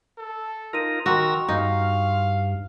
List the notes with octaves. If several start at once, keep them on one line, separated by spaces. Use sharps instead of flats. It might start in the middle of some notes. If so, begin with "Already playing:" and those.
A4
D#4 F4 A#4 A#6 D#7
D#3 F#4 A#4 G5 A#5 C6 C#6 E6
G2 D#4 F5